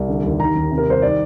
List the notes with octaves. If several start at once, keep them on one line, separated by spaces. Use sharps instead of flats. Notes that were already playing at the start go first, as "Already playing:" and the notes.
Already playing: C2
D3
D#2
D#3 A#5
D#2
C3
A#4
C2 C5
D#3 D5